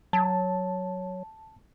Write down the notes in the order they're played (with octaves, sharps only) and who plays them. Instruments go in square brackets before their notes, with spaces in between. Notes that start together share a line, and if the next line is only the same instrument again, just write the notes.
[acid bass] F#3 [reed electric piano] A5